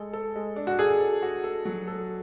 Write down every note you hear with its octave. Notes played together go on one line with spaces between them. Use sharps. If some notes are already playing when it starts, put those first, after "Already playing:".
Already playing: G#3 A4
A4
G#3
D4
F#4
G#4 A4
A4
F#4
A4
F#3
A4